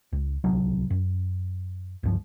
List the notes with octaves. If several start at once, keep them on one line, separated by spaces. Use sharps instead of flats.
C#2
D1 C2 F#3 D4
F#2
C#2 G2 F3